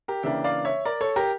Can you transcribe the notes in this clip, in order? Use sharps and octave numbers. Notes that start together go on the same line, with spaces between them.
G4 A#4
C#3 E3 A#3 D4 E5 G5
D5 F5
C#5 E5
A#4 D5
A4 C#5
G4 A#4